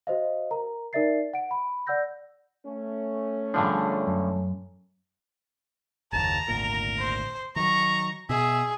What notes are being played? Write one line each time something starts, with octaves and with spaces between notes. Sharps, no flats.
F#4 C5 D#5 F5
A#4 A#5
D#4 A#4 D5 E5 A6 C7
F#5 D7
B5
D5 F#5 E6 G6 A#6
A3 C#4
G2 D3 F3 D4 F4 G#4
F#2
F#1 D#2 A5 A#5
G#1 D2 A#2 A#4
C5
D#3 F#3 A#5 C#6
B2 G#4 E5